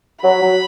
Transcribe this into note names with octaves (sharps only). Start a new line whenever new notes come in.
F#3 B5
F#3